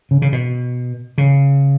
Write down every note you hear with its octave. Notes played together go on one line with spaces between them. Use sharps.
C#3
C#3
B2
C#3